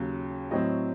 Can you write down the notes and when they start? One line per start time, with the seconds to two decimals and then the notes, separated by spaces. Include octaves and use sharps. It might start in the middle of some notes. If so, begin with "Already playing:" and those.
Already playing: D#2 C#3 F#3
0.51 A2 F#3 C4 D#5